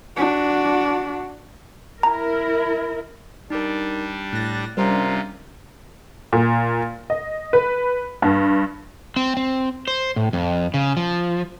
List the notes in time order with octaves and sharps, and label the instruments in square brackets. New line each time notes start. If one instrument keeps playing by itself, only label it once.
[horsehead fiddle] D4 F#4
[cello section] E4 A#4 [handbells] A#5
[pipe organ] G3 D4 [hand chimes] D#4 A#4
[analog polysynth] A2 A#6 [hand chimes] F#6 A6
[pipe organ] C3 F4 [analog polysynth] G3 C#4 D4 [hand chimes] A#4 C5 A#5
[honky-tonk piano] A#2
D#5
B4
G2
[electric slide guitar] C4
C4
C5
A2
F2
C#3
F3